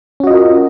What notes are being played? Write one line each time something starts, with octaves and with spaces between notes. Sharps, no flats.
C#4 F4 F#4 A#4 D#5